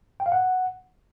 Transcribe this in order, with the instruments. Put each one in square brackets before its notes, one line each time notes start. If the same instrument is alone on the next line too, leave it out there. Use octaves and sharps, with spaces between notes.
[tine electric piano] G5
F5
F#5